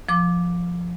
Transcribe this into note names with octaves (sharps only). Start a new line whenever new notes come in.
F3 D6